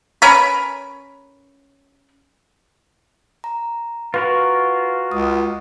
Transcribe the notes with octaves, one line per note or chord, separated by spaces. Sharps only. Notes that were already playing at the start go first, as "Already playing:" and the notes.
C#4 A#4 B4
A#5
F4 F#4 A#4 B4
C#2 D#6